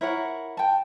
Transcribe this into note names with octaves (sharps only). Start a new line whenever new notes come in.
E4 A#4 C#5 F#5
G5 A5